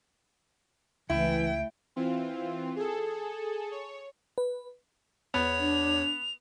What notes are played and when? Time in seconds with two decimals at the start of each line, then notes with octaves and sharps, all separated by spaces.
1.10 C#2 E3 A3 E4 G5
1.96 E3 C4 F4
2.76 G#4 A4
3.71 C#5
4.38 B4
5.34 E2 B3 C#5 F7
5.59 D4